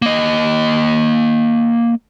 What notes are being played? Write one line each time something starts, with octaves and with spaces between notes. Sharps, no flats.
A#3 D#5